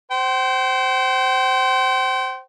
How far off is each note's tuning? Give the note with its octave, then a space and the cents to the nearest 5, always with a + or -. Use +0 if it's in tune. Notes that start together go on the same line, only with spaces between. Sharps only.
C5 +0 G5 -40